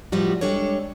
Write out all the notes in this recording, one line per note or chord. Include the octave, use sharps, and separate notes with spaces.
D#2 A2 F3 G3 F#4
G3 G#3 D4 A4 C#5